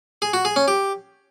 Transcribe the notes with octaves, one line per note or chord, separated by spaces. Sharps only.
G#4
F#4
G#4
C#4
G4